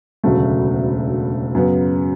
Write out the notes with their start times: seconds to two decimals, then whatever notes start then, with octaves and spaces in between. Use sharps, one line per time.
0.24 E1 D2 C#3 F#3 A3
1.55 F#2 C#3 F#3 B3